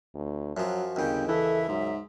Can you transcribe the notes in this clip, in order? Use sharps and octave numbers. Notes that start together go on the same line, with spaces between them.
D2
F#2 F3 F#3 F#4
G1 D#2 C#3 G5
E3 A4 E5
G#2 F#3